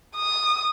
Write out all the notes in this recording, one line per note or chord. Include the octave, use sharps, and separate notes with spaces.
D#6